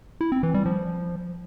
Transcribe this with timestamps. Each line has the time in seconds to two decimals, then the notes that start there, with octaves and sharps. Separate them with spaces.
0.21 E4
0.32 C4
0.43 E3
0.54 G3
0.66 F3